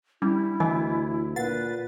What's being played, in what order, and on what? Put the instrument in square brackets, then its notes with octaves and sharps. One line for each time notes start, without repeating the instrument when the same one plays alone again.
[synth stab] G3 [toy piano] D4 [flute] E4
[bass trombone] D2 [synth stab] E3 [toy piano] D#5 G#5 E6
[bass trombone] A#2 [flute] B4 [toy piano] F#5 [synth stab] A6